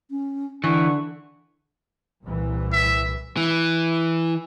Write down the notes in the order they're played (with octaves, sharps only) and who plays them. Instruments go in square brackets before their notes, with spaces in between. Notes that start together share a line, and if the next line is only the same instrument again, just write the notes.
[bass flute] C#4
[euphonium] D3 [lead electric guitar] E3 [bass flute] A4 [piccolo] C#6
[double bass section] C2 A#2 E3
[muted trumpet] E5
[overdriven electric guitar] E3